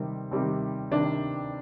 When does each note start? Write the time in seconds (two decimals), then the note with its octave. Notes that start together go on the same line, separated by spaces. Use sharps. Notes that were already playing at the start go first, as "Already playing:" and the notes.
Already playing: C3 D#3 G3 C4
0.31 C3 D#3 G3 C4
0.91 C3 D#3 D4